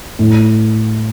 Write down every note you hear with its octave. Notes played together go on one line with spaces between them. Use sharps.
A2